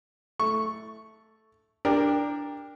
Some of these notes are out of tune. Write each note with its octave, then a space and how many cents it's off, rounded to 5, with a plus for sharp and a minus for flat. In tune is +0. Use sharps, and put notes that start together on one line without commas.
A3 +0 C#6 +0
D4 +0 G4 +20 A#4 +0